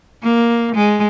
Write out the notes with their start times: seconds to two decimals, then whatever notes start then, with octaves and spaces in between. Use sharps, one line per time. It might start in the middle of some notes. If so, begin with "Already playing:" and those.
0.23 A#3
0.75 G#3